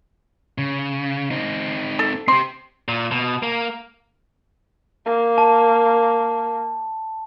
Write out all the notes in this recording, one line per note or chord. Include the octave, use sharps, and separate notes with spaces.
C#3
C4 D#4
A4
C4 G4 C6
A#2
B2
A#3
A#3
A5